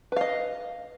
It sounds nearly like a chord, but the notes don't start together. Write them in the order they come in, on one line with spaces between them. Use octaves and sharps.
B4 F5 D#5